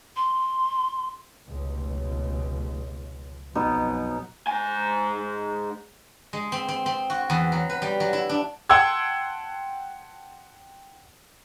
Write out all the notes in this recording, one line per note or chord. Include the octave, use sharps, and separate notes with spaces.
C6
F1 C#2 B2
B1 F2 B2 F#3 B3 D#4
G#2 G#5
G#3
C4
C4
C4
F#4
E2
F#3
B4
G3
F#3
E4
D4
F#5 G5 A5 C6 E6 G#6